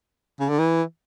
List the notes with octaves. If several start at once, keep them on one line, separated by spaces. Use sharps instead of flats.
C#3
D3
E3